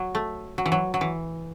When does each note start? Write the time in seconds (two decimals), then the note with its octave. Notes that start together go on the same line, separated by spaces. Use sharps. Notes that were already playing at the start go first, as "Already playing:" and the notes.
Already playing: F#3
0.15 A3
0.58 F#3
0.66 E3
0.72 F#3
0.94 F#3
1.01 E3